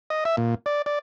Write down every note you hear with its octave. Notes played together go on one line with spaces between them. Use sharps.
D#5
E5
A#2
D5
D5